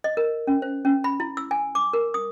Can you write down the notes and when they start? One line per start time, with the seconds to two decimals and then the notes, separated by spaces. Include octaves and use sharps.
0.04 D#5
0.17 A#4
0.47 C#4
0.62 C5
0.85 C#4
1.04 B5
1.20 E4
1.37 E6
1.51 G#5
1.75 D6
1.93 A#4
2.14 D#6